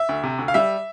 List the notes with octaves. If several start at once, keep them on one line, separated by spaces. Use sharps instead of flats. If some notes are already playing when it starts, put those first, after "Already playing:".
Already playing: E5
D2
C3
D2
F5
G3 E5